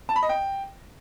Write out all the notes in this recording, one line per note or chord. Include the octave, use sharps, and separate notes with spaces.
A5
B5
D#5
G5